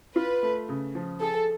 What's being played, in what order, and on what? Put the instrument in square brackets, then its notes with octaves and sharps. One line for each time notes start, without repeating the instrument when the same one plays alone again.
[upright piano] F4 [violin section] B4
[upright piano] A3
C#3
F3
[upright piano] G#4 [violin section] A4